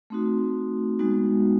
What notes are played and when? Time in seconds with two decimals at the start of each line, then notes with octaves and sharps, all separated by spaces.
0.10 A3 C4 D#4 F#4
0.99 G#3 B3 D#4 F#4